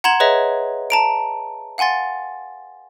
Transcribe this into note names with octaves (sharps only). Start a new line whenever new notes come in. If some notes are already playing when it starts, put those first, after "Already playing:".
F#5 A#5 C6 G#6 E7 F#7
G#4 B4 C#5 D#5 E5 A#5
A5 A#5 D7
F5 F#5 G#5 C6 A6